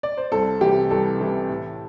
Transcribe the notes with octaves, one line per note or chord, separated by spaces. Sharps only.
D5
C5
C2 A4
C3 E3 G3 G4
C2 A4
C3 E3 G3
A2